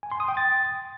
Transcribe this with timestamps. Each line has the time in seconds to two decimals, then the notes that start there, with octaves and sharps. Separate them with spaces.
0.03 G#5
0.12 C6
0.20 D#6
0.28 G5
0.37 A6